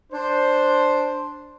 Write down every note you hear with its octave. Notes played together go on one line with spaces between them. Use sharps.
D4 C5